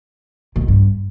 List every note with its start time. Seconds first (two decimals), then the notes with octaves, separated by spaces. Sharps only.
0.56 G#2
0.62 B2
0.68 G2